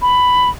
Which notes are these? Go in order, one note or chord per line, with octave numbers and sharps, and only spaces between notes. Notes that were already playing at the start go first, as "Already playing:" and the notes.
B5